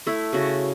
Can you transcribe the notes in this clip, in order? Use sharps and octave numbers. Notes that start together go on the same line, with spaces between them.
A3 E4
C#3 F#4